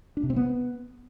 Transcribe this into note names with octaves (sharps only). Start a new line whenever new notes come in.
D4
C3
C4
B3